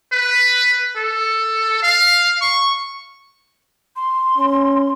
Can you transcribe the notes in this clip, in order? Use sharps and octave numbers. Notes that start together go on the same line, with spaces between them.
B4
A4
F5
C#6
C6
C#4